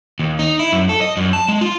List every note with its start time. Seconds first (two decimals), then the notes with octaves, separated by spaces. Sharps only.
0.19 D#2
0.39 D#4
0.59 E4
0.72 F#2
0.89 A4
1.02 D#5
1.17 F#2
1.33 A5
1.48 G#3
1.61 F4